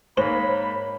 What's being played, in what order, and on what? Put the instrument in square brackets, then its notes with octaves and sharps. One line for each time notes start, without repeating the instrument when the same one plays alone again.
[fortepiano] G#2 A#3 [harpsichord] C5 [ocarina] C#5 [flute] B5